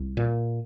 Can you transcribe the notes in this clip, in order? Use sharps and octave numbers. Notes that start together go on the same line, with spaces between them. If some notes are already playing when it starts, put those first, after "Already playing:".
Already playing: C2
A#2